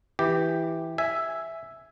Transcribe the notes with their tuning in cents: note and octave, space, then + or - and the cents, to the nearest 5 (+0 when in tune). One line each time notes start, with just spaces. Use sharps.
E3 +0 G4 +0
E5 +0 G#5 +0